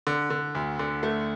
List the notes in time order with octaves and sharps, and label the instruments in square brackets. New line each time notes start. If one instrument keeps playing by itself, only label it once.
[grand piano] D3
D3
D2
D3
A3